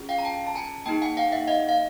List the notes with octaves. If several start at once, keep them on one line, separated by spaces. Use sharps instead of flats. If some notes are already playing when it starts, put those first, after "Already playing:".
Already playing: C#4 F4 G#4
F5 G5
A#5
G5 A5
A5
G#5 A#5
A#3 D#4 G#4 G5 A5
F#5 G#5
F5 G5
E5 F#5
D#5 F5
F5